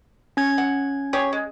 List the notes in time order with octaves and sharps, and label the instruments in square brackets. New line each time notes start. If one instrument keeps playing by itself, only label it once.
[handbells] C#4 G#6
[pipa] F#5
G4 G#4 C#5
G#3